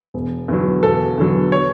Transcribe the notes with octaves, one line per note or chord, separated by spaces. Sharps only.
E1
E2 D3 F#3
E1 A4
E2 D3 F#3
C#5